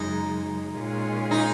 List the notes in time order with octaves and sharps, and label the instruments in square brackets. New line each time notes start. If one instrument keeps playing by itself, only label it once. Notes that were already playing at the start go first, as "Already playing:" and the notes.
Already playing: [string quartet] F#2 C#3 G#3 [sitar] D#4
[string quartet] A#2 G#3 C#4 F4 G#4
[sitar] D#4